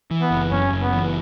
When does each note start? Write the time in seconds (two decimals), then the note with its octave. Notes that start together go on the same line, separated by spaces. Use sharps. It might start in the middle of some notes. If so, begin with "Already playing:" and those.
0.11 E3
0.21 B3
0.31 F#1
0.51 F#2 C#4
0.72 F#1
0.82 B3
0.92 E3